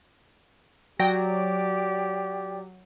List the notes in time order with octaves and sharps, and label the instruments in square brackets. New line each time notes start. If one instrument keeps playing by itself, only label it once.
[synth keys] F#3 [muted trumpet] G4 [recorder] D5 [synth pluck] G5 A#6